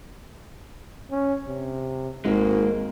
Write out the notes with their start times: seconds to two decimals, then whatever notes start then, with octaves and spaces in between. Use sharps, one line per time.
1.11 C#4
1.48 C3
2.25 G#1 G#2 G#3 A#3